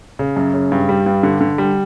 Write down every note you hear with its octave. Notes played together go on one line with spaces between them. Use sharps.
C#3
F#2
C#3
G2
G3
G2
D3
D3
G3